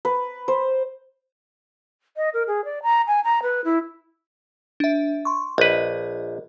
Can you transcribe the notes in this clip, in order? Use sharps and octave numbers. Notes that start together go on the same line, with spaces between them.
B4
C5
D#5
A#4
G#4
D5
A#5
G#5
A#5
B4
E4
D4 E5
C6 C#6
A#1 B4 D#5